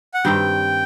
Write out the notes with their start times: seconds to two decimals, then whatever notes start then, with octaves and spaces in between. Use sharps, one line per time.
0.14 F#5
0.24 G2 D#3 G3 C4 G5